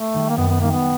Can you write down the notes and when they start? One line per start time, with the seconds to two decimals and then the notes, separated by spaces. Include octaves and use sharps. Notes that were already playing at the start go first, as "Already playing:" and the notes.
Already playing: A3
0.14 D#3 G3
0.29 A#3
0.37 F#2 B3
0.49 B3
0.60 D#3 G3 A#3
0.72 B3